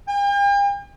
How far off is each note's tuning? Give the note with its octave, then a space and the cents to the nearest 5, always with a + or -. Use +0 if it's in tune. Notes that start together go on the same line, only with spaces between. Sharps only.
G5 +45